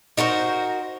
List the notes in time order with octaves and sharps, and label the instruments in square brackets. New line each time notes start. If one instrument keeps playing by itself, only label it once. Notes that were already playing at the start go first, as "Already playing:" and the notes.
[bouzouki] D#4 F#4 A#4 C5